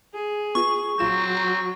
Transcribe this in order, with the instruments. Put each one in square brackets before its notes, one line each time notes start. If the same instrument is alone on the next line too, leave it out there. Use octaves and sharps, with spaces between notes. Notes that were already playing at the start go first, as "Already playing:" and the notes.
[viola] G#4
[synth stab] B3 F4 [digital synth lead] C#6
[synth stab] A#1 F4 E7 [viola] F#3 [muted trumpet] C4